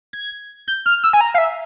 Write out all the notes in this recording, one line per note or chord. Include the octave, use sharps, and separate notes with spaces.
G#6
G6
F6
E6
G#5
A#5
F5
E5